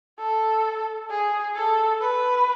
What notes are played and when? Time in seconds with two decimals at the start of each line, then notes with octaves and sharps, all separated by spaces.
0.19 A4
1.10 G#4
1.56 A4
2.01 B4